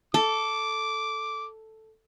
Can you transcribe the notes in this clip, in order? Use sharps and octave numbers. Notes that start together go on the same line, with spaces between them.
A4 D6